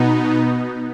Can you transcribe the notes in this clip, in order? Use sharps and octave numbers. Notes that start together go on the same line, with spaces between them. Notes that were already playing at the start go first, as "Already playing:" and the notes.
Already playing: B2 B3 D#4